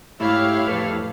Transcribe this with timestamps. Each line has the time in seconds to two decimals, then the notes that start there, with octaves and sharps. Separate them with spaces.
0.20 G#2 A3 E4 G4 C#5 F5
0.68 F2 A2 A4 B4